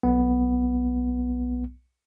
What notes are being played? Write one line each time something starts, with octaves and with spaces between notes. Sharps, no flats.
B1 B3